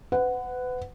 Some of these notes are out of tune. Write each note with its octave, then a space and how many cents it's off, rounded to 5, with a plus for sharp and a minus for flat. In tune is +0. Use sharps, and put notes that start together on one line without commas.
B4 +35 F#5 +0